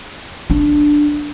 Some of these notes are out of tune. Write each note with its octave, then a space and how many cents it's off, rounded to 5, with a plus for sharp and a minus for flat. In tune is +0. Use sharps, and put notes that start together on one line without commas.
D4 +5